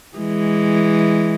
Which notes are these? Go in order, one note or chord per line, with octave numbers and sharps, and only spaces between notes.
E3 G#3